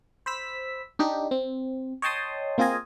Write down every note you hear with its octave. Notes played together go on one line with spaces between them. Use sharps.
C5 B5 E6 B6
D4 D#4 G4
C4
C#5 D#5 G5 A5 C6 D#6
A#3 C4 F4 G#4 D#5 G#5